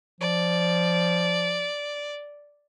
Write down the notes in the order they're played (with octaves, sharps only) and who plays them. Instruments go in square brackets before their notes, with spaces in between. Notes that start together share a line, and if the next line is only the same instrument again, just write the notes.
[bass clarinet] F3 [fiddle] D5